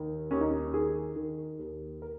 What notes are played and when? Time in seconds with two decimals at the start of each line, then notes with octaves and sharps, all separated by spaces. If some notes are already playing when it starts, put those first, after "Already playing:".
Already playing: D#2 D#3
0.31 D#2 C#4
0.41 D#4
0.50 C#4
0.74 D#3 G#4
1.16 D#3
1.59 D#2
2.02 A#4